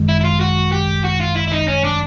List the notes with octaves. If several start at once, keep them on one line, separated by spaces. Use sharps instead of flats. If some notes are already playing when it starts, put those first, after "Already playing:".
Already playing: G#1 F#2 D#3 G#3
E4
E4
F4
F#4
G4
F#4
F4
E4
E4
D#4
C#4
D4